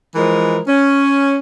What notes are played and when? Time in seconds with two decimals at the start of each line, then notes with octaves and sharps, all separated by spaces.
0.15 E3 F3 G#3 A#4
0.67 C#4